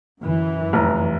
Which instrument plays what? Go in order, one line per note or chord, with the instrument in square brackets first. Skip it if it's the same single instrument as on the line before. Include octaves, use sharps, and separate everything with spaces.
[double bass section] F#2 E3
[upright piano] F1 A#5